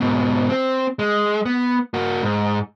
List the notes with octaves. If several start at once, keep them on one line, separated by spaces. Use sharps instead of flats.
G#2 B2
C4
G#3
B3
A#3 F#4
G#2